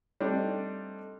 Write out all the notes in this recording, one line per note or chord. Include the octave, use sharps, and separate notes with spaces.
G3 A3 C4 D4 D#4